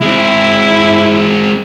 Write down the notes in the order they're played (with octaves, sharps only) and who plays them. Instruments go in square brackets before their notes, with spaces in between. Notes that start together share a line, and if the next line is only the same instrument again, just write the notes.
[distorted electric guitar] G#3 C4 [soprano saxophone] E4